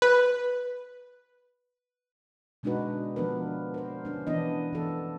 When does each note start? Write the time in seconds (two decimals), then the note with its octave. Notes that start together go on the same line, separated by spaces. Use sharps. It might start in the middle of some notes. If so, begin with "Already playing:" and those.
0.02 B4
2.63 B2 G#3 D4 D#4 F#4 B4
3.16 F3 B3 D4 A#4 B4
3.74 A#4 C5
4.05 C#4 D4
4.27 E3 B3 D4 E4 D#5
4.73 E3 A4